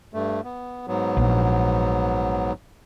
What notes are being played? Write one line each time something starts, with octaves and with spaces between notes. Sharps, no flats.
G2 A3
B3
G#2 F#3 B3
A#1